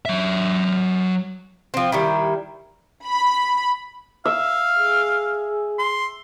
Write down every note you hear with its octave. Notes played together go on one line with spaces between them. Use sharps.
F#3 E5
F3 C4
D#3 G3 E4
B5
E5 F5
G#4
C6